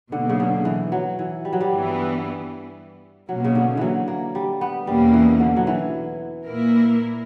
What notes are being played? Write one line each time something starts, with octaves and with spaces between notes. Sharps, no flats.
B2 D3 F#3 A#3
C#3
D3
E3
F#3
E3
G3
F#3
G3
G2 E3 B3
B2 F#3 A#3 C#4
C#3
D3
E3 F#3
A#3
G3
B3
E2 B2 G3 A#3 C#4
E3
D3
F#3
E3
A#2 A#3 E4 A#4